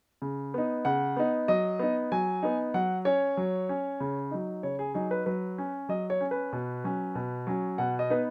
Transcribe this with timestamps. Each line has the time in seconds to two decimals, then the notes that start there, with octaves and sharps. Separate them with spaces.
0.22 C#3
0.54 B3 D#4
0.85 C#3 F#5
1.16 B3 D#4
1.48 F#3 D#5
1.79 B3 D#4
2.12 F#3 G#5
2.43 B3 D#4
2.74 F#3 F#5
3.05 C#4 C#5
3.37 F#3
3.69 C#4
4.00 C#3
4.31 F#3 D#4
4.63 C#3 C#5
4.79 G#4
4.94 F#3 D#4 G#4
5.11 B4
5.26 F#3 B4
5.58 C#4
5.89 F#3 D#5
6.10 C#5
6.21 C#4
6.31 B4
6.53 B2
6.84 F#3 C#4
7.15 B2
7.47 F#3 C#4
7.78 B2 F#5
7.99 D#5
8.10 B3 D#4 B4